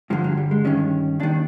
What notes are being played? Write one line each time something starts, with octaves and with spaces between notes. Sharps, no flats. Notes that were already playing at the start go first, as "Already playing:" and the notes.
G2 D3 F3
F#3
G3
G#3
G2 D#3 C#4
D#2 D#3 D4